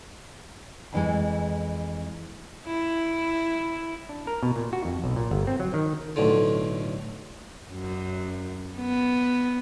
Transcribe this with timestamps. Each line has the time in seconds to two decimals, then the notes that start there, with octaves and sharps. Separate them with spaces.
0.93 F2 E3 G#3
2.66 E4
4.09 D4
4.27 A#4
4.43 B2
4.56 A#2
4.73 F#4
4.85 F2
5.04 B1
5.16 A#2
5.31 G1
5.47 C4
5.60 F#3
5.74 D#3
6.16 B1 A2 D3
7.72 F#2
8.77 B3